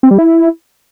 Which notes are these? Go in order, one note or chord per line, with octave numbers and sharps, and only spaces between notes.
C4
G3
E4